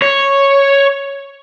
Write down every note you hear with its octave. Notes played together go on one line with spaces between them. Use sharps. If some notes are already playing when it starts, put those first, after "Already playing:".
C#5